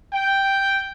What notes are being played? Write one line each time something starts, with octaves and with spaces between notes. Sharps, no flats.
G5